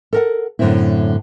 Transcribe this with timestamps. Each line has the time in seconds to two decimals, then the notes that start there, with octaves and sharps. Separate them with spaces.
0.13 A4 A#4 F#5
0.59 F#2 A2 D3 A3 C4 E4